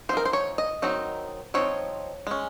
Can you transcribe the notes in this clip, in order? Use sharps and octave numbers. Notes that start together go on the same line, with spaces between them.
F3 C4 D#4 A#4 C5
C5
C#5
D#5
D#3 F#3 C4 D#4
F3 C4 D#4 C#5
G#3 C#4